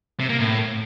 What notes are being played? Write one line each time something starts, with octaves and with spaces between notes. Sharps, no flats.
C3
A#3
A2